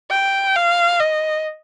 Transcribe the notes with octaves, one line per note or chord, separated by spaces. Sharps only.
G5
F5
D#5